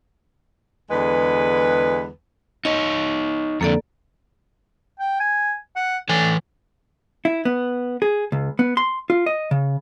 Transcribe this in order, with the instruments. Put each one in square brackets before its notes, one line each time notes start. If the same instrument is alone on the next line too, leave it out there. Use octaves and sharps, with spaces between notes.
[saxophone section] E2 D3 G#3 B4
[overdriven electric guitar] D#4 C#5 [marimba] D#5
[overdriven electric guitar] F2 D3 [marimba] A#3 A4 D5
[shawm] G5
G#5
F#5
[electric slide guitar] E3 A4 G#5 [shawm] D4
[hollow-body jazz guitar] E4
B3
G#4
C#2
B3
C6
F4
D#5
C#3